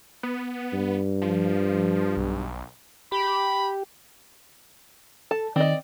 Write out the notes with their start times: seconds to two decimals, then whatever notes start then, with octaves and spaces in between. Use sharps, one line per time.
0.23 B3
0.74 G2
1.22 F3
2.17 B1
3.12 G4 B5
5.31 A4 A5
5.56 D#3 C4 D5 D#5